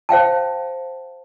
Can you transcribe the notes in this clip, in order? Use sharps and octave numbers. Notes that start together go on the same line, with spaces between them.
C5 F5 G5 A5